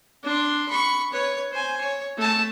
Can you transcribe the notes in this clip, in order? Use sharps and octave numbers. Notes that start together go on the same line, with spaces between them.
D4 C6
B5 C#6
B4 C#5
C5 G#5
C#5
A3 A5